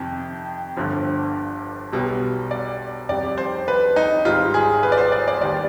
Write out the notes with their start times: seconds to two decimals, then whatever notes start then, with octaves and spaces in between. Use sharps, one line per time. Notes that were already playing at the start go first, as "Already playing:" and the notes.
Already playing: F2 C3 D#3
0.77 G1 G2 D3 F3
1.92 B1 B2 G3
2.51 D5
3.09 F2 D#3 G3 D5
3.38 C5
3.68 B4
3.96 D#4
4.25 G#1 G#2 G3 F4
4.54 G#4
4.83 B4
4.92 D5
4.98 C5
5.12 D5
5.28 D5
5.41 D#2 D#3 G3 D5